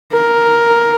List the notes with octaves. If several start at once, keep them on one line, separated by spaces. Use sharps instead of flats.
A#4